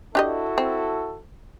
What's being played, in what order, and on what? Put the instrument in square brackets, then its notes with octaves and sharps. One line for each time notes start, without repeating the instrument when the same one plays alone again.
[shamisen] D4 G4 D#5 [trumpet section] E4 F#4 A4
[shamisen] C4